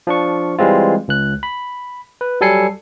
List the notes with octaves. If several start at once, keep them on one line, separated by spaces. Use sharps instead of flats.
F3 D4 C#6
E3 G3 G#3 C4 F4
C#2 F#6
B5
B4
F#3 G3 A4 G#5 C7 C#7